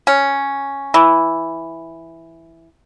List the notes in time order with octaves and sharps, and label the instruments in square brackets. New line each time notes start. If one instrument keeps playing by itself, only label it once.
[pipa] C#4
E3